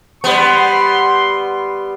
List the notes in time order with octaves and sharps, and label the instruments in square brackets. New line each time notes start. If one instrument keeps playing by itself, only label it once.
[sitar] G3 B3 [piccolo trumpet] C6